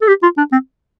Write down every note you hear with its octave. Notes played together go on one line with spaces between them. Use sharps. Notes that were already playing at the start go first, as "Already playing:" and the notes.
A4
G4
F4
D4
C4